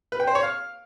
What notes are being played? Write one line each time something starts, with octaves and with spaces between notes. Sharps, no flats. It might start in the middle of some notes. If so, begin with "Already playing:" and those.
B4
G5
C5
C#5
F5